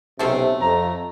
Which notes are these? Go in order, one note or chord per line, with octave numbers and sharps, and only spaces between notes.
B1 C3 A3 C4 C#4
F2 A#5